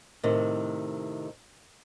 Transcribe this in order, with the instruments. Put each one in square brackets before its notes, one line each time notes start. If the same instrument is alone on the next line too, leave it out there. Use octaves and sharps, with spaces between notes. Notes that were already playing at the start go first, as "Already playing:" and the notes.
[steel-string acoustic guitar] A2 C3 D#3